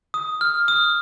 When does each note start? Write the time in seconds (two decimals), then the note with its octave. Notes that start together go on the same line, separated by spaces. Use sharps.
0.14 D#6
0.41 F6
0.68 D#6